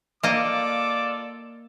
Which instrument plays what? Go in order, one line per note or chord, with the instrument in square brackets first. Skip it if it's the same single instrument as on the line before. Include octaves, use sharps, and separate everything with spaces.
[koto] A#3 D#5 [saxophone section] F4 A4 D5 [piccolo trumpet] D6